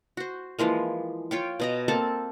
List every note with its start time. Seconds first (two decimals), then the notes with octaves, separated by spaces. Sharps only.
0.17 F#4 C5
0.59 E3 F3 G#3 A#3
1.31 F4 C#5 G5
1.60 B2 D#5 A#5
1.88 A#3 C4 A4 A5